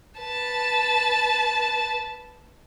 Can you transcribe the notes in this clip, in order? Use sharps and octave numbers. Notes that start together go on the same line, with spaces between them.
B4 A5